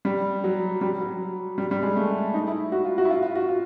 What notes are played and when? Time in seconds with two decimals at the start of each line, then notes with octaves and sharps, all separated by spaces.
0.05 G3
0.44 F#3
0.81 G3
1.01 F#3
1.58 G3
1.71 G3
1.83 G#3
1.96 A3
2.34 D#4
2.47 E4
2.72 F#4
2.85 F4
2.98 F#4
3.05 E4
3.10 F4
3.23 F4
3.35 F#4
3.49 F4